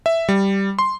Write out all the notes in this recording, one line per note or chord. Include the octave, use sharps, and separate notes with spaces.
E5
G3
C6